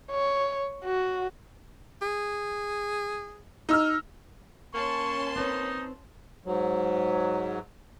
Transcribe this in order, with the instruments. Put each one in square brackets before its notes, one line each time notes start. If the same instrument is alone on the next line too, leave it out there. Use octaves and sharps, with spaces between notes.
[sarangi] C#5
F#4
[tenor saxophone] G#4
[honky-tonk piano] D#4 E6 F6
[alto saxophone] A#3 [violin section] C#4 A5 C6 [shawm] C#6
[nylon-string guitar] C4 B4 C#5 [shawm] D#4
[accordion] G#2 F#3